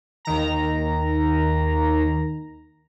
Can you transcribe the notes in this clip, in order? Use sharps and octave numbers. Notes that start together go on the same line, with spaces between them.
D#2 D#3 A#5